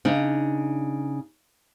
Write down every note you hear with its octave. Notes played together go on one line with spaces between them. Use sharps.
C#3 D4 D#4